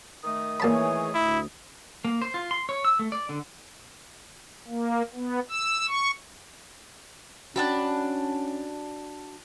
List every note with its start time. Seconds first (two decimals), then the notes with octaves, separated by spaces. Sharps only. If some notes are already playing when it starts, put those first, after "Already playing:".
0.24 D#3 A3 D#6
0.60 A#2 E3 G#4 C#5 A5 B5
1.15 D2 E4
2.05 A#3
2.22 C5
2.34 F4
2.51 C6
2.69 C#5
2.85 E6
2.99 A3
3.12 D5
3.29 D3
4.68 A#3
5.14 B3
5.49 E6
5.88 C#6
7.56 C#4 D4 F#4 G5 A5 B5